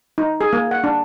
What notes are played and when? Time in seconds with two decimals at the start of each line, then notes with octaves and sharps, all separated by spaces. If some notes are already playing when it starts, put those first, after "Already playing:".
0.18 D#4
0.41 G#4
0.53 A#3
0.71 F#5
0.84 D4